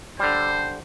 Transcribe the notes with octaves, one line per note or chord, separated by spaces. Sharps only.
D3 G3 C5